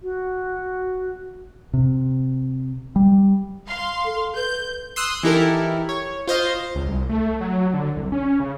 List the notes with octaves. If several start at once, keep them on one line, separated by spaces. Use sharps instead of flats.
F#4
C3
G3
F5 C6
A4
B4 G6
C6 D#6 E6 F#6
E3 D#4 E4 G4 A4 A#4
C#5
F4 C5 D#5 F5
C#2
C2
A3
F#3
D3
C2
C#4
C#3